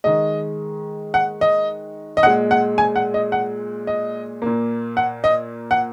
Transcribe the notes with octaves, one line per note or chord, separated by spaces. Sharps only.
D#3 G#3 D#5
F#5
D#5
D#5
A#2 G#3 F#5
F#5
G#5
F#5
D#5
F#5
D#5
A#2 A#3
F#5
D#5
F#5